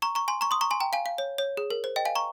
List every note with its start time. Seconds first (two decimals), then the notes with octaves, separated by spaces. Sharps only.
0.02 A#5 C#6
0.15 A#5 C#6
0.28 G#5 C6
0.41 A#5 C#6
0.51 C6 D#6
0.61 A#5 C#6
0.71 G#5 C6
0.80 G5 A#5
0.93 F5 G#5
1.06 F5
1.18 C#5
1.38 C#5
1.57 G#4
1.70 A#4
1.84 C5
1.96 D#5 G5
2.05 F5 G#5
2.15 A#5 C#6